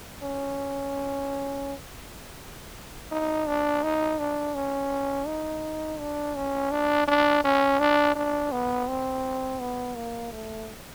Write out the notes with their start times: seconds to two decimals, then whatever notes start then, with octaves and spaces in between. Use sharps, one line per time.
0.23 C#4
3.11 D#4
3.46 D4
3.83 D#4
4.18 D4
4.55 C#4
5.27 D#4
5.99 D4
6.36 C#4
6.71 D4
7.08 D4
7.44 C#4
7.80 D4
8.16 D4
8.52 B3
8.88 C4
9.60 B3
9.96 A#3
10.32 A3